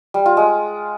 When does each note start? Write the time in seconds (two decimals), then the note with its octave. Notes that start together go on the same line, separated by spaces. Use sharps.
0.14 G3
0.26 F4
0.37 G#3